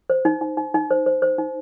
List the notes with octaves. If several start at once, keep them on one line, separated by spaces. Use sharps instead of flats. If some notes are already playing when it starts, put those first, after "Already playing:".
C5
D#4
D#4
D#4
D#4
C5
C5
C5
D#4